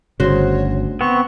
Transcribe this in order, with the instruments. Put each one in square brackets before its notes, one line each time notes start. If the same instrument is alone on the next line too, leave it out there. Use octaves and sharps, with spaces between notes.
[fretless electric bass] G1 C#3 [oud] D2 F#4 C5 [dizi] C#5
[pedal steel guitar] B3 C4 [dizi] C#6